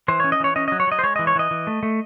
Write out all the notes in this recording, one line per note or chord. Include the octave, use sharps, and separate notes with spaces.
E3 C5
C#4 C#5
D#5
E3 C#5
C#4 D#5
F#3 D#5
C#5
F#3 D#5
C5
G#3 C#5
E3 D#5
C#5
E3 D#5
E3
A3
A3